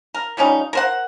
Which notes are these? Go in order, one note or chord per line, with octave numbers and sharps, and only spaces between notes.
A#4
F3 G3 C#4 D#4
A#4 C5 F#5